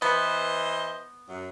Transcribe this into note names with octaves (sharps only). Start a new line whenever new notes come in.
E3 B3 C5 D#5
F#2